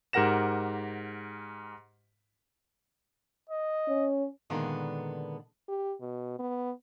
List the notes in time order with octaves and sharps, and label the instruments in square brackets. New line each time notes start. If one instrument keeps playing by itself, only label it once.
[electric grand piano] G#2 G4 A#4 F#5 A#6 E7
[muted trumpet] D#5
[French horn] C#4
[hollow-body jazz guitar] A#2 D3 D#3 G#3 A#3 B3
[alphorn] G4
B2
B3